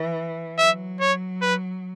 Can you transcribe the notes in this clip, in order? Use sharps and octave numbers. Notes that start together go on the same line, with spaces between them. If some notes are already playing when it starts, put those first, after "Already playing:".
Already playing: E3
F#3 E5
C#5
B4